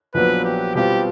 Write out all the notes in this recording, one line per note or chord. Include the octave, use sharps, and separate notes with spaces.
A#1 A#2 F#3 B3 B4
G4
B2 G3 C4 F4 G4